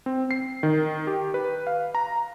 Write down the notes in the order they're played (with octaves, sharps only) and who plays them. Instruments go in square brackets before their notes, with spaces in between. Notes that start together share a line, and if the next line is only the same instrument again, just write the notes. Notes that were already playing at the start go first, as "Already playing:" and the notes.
[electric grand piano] C4
C7
D#3
G4
B4
F5
A#5